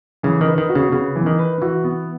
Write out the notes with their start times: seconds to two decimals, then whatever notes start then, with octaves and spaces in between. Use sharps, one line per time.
0.23 C#3 E3
0.41 D#3
0.47 B4
0.58 D#3
0.69 F#4
0.75 C#3
0.92 C#3 B3
1.16 E3
1.26 D#3
1.38 B4
1.62 E3 F#4
1.84 B3